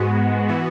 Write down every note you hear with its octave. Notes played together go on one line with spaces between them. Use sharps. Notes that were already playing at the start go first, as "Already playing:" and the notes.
Already playing: G#2 G#3 B3 F#4
E3 B3 F#4